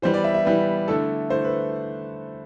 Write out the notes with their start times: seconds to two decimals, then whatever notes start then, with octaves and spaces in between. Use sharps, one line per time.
0.02 E3 G3 B3 C5
0.14 D5
0.24 E5
0.34 E5
0.45 E3 G3 B3
0.88 D3 A3 E4 A4
1.30 D3 A3 E4 C5
1.45 B4